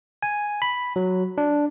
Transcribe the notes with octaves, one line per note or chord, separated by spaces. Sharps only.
G#5
B5
F#3
D4